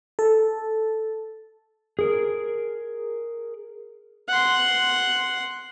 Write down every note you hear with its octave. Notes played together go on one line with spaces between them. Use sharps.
A4
G#4 A#4
F#5 C6